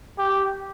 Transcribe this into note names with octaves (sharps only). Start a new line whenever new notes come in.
G4